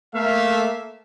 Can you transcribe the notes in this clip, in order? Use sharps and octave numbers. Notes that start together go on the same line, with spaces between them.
A3 A#3 E5 F5